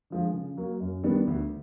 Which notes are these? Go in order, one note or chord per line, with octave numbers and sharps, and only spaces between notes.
D3 F3 G#3
C#3
F#3 A#3
F#2
D#3 G3 B3 D4
D2